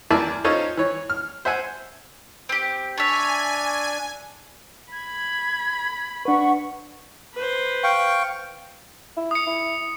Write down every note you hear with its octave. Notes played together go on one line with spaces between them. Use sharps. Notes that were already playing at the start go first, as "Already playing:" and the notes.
E2 E3 A#4 D5 E5 A5
C#4 D#4 F4 A4 C5 C#5
E3 C#5
F6
C5 E5 F#5 G#5
C4 G4
D4 C#5 D5 E5 G#5
B5 G#6
D4 B4 F#5 C#6
B4 C5
F5 G5 C#6
E4
D#6 C#7
E4